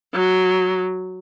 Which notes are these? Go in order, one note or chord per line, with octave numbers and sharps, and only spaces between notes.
F#3